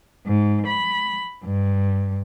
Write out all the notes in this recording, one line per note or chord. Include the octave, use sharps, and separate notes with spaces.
G#2
B5
G2